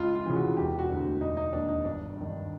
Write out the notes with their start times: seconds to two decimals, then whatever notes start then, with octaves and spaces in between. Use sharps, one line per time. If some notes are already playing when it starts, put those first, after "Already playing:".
Already playing: C#2 F4
0.15 F4
0.26 C#3 E3
0.35 F#4
0.57 E1 G4
0.79 F#4
0.89 D2 D3
1.21 E1 D#4
1.37 D#4
1.53 D#2 D#3 D4
1.69 D#4
1.85 G1 D4
2.16 G2 D#3